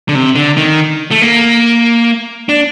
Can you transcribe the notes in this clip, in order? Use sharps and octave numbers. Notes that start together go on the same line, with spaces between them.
D3
C3
D3
D#3
A3
A#3
D4